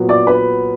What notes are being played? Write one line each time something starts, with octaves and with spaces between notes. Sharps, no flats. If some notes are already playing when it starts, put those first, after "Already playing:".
Already playing: A#2 F#3 B3
D5 D6
B4 B5